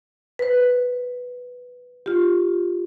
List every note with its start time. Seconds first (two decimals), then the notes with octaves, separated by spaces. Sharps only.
0.39 B4 C5
2.06 F4 G4